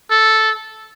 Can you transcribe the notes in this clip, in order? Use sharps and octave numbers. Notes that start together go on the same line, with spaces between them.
A4